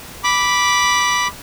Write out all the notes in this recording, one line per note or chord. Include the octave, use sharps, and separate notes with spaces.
B5 D6